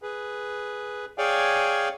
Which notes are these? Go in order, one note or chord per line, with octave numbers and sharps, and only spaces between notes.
G#4 B4
G#4 C#5 D5 F5 G5 G#5